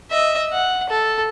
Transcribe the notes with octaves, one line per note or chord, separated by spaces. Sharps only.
D#5 E5
F#5
A4